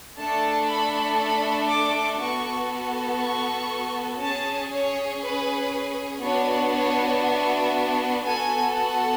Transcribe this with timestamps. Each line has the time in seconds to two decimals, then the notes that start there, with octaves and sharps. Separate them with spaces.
0.19 A3 D4 A4 A5
0.69 B5
1.20 B5
1.69 D6
2.20 B3 F#4 A4 C#6
3.21 C#6
4.21 C#4 G#4 A5
4.72 C#5
5.22 B4
6.23 B3 D4 F#4 C#5
6.74 C#5
7.23 E5
8.25 B3 F#4 A4 G#5
8.76 F#5